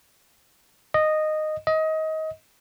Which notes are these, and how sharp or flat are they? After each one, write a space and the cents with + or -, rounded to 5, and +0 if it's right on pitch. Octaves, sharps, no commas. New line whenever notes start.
D#5 -10
D#5 +25